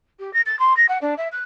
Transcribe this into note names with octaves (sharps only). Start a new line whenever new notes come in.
G4
A#6
A6
C6
A#6
F#5
D4
E5
F#6